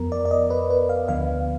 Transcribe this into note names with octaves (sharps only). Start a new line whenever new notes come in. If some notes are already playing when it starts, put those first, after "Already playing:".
Already playing: F2 F3 B3 A#4
D5
D5
D#5
B4
B4
F5
D2 D3 F3 B3 F5